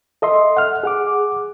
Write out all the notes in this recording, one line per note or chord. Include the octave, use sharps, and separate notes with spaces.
A4 D#5 E5 C6
F#5 F6
G#4 F#5 D6